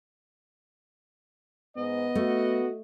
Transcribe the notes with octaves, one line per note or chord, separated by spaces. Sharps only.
G#2 B3 D#5
A3 F#4